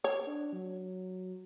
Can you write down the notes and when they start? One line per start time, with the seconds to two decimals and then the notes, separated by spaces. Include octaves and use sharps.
0.04 C#5
0.26 D4
0.53 F#3